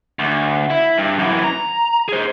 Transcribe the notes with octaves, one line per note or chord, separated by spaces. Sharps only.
D2
E4
G2
F#2 E3
A#5
G#4 C5